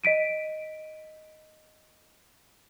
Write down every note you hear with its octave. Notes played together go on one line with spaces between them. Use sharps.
D#5 B6 D7 D#7